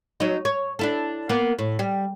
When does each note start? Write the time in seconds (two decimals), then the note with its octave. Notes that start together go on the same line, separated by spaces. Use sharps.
0.20 F#3 D#4
0.45 C#5
0.79 D4 E4 A4
1.29 A#3 B3
1.59 A2
1.79 G3